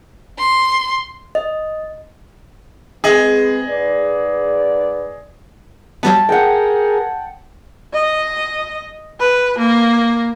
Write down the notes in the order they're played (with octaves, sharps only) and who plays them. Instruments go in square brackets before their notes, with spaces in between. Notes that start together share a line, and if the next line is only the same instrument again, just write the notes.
[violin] C6
[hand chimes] D#5
[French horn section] G#3 B3 C4 [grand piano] G#4 D#5
[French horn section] G#2 B4 D5
[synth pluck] F#3 G3 B3 [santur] A5
[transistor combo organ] G#4 A#4 [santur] F#5 G5
[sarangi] D#5
B4
A#3